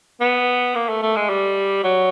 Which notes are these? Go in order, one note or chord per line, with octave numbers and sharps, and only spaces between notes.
B3
A#3
A3
A3
G#3
G3
F#3